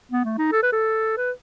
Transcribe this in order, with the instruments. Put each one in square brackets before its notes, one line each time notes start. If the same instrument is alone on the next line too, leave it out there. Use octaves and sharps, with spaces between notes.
[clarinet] B3
A3
D#4
A4
B4
A4
B4